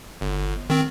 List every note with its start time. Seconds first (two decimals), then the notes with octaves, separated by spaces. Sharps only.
0.21 G1
0.70 D#3 C4